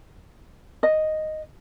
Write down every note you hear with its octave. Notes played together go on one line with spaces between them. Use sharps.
D#5